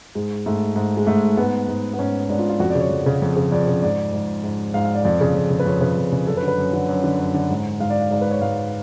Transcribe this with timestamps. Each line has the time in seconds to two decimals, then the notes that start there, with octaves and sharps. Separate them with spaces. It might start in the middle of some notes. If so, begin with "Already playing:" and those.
0.15 G#2 G#3
0.46 G#2 A3
0.76 G#2
0.97 G#3
1.07 G#2 A3
1.37 G#2 B3
1.68 G#2
1.93 B3
1.99 G#2 C#4
2.29 G#2 D4
2.39 F4
2.49 F4
2.60 F2 F#4
2.70 D5
2.75 C#3
2.80 C#5
2.90 F2
3.06 C#3
3.22 F2
3.36 C#3
3.52 F2 D5
3.68 C#3
3.82 G#2 D5
4.13 G#2
4.43 G#2
4.74 G#2 F5
4.85 F5
4.95 D5
5.05 F2 D5
5.21 C#3
5.35 F2
5.50 C#3
5.60 B4
5.66 F2 C#5
5.81 C#3 B4
5.97 F2
6.12 C#3 G#4
6.27 F#2 A4
6.37 B4
6.42 D3
6.48 B4
6.58 F#2
6.73 D3
6.89 F#2
7.04 D3
7.19 F#2
7.34 D3
7.50 G#2
7.80 G#2 F5
7.90 D5
8.01 F5
8.11 G#2 D5
8.21 B4
8.31 C#5
8.41 G#2 F5